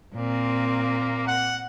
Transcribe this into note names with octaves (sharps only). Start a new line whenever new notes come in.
A#2 A#3 C4
F#5